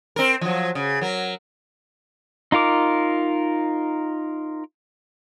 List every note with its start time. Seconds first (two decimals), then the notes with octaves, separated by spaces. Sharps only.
0.16 C4 A#4
0.41 F3 F#3
0.75 C#3
1.01 F#3 A#4
2.52 D#4 F4 A#4 D6